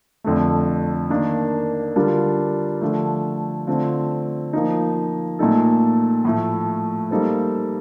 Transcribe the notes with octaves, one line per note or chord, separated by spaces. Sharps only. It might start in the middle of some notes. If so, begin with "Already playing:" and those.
F2 D3 A3
D#3 A#3 D4
D3 G3 D4 F4 A#4
D3 F3 A3
D3 A3 C4 F4
F3 A#3 D#4
A#2 A3 D#4 A4
A2 F3 A3
G3 A#3 D#4 A4 C5